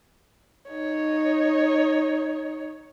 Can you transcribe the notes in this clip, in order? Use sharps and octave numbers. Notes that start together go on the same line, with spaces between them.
D#4 C#5